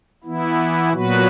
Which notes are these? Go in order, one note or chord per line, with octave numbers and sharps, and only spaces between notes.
E3 B3 E4
A#2 F#3 B3 F#4 B4